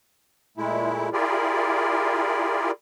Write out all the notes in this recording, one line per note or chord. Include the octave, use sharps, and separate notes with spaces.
A#2 G#3 A3 E4
E4 F4 G4 G#4 A#4 D5